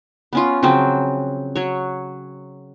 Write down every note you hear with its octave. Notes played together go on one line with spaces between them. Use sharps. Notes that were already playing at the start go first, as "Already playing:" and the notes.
B3 C#4 F4
C#3 F3 F#3 C4
F#3 C#5